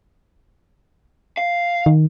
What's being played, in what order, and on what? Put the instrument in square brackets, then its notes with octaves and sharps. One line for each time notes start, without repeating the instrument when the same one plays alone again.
[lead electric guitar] F5
[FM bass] D#3